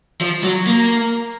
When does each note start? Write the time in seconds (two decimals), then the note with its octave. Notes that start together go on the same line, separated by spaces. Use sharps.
0.21 F3
0.43 F#3
0.67 A#3